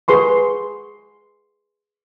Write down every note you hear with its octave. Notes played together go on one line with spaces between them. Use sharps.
G#4 B4 C6 C#6